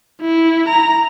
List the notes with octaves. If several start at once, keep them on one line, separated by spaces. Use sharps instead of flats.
E4
A#5